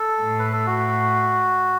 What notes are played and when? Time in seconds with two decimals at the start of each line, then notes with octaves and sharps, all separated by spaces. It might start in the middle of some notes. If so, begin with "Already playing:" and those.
Already playing: A4
0.22 A2
0.39 B4
0.53 A4
0.67 F#4